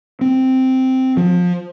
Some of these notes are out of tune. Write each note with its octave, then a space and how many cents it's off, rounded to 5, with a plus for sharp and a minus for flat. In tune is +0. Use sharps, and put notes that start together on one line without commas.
C4 -5
F3 +25